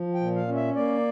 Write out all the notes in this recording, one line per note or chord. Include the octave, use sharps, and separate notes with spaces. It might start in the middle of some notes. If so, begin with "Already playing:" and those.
Already playing: F3
G5
A#2
F5
C#4
E5
A#3 D5